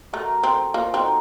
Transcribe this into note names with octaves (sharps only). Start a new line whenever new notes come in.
A3 F#4 A#4
C4 A4 C5
A#3 F4 A4
C4 D#4 F#4